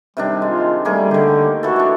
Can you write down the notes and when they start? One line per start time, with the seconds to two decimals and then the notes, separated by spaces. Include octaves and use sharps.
0.17 C3 D#3 G3 D4
0.42 G#3 F4
0.85 G3 A3 A#3 G#4
1.11 D3 D#3 G4
1.63 E3 F#4 A4
1.76 D4 C#5